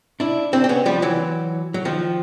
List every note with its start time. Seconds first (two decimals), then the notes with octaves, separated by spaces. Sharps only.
0.20 D4 E4
0.53 C4 D4
0.64 C4
0.69 B3 C#4
0.86 F3 G3
1.02 E3 F#3
1.74 F#3
1.85 D#3 F3